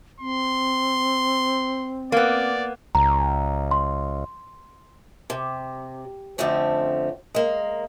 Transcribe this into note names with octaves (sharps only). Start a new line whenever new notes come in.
C4 C6
A#3 B3 D5
C#2 A#5
C6
C3
F2 D3 F3 A3 C4 C#4
G#3 A#3